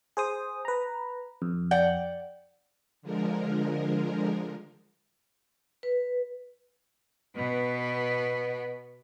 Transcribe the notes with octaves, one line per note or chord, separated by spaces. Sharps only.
G#4 C5 D#6
B4 A#5
F2
D5 F#5 G5
D3 F3 G#3 A#4
B4
B2 B3